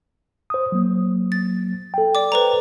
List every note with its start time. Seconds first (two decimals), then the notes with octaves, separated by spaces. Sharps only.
0.50 C5 D#6
0.72 F#3 A#3
1.32 A6
1.94 A4 G5
2.15 D5 D6
2.32 B4 C5 A#5